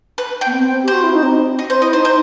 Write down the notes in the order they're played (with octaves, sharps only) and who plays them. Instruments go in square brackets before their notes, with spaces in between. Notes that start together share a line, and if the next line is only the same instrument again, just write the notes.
[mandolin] B4
G5
[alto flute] B3
C4
[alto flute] G4 [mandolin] C5
[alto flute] F#4
E4
D#4
C4
[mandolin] D#5
C5
[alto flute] E4 [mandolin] D#5
[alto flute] D#4 [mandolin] C5
[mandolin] C5